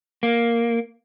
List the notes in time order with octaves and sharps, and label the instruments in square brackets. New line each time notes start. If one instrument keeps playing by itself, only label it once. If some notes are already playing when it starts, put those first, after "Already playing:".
[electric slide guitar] A#3